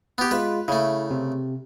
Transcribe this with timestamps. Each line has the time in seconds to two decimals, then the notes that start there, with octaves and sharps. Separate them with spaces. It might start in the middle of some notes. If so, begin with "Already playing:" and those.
0.18 B3 G4
0.31 G#3 F4 B4
0.68 C#3 A3 E4
1.11 C3